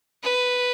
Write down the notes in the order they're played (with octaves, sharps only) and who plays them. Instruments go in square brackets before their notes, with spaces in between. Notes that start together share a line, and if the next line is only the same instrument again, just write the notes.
[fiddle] B4